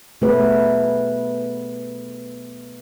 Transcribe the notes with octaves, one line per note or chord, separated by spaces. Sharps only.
B2 A3 B3 G#4 B4